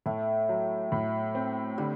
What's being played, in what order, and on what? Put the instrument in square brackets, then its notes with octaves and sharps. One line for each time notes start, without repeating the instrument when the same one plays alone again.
[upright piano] A2 [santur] A3
[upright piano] F#3
A2
C4
[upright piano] D3 [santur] G3